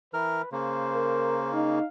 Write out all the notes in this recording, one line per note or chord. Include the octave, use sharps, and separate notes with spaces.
E3 A#4 B4 F6
C#3 A#3 C5
A#4
D#4 F5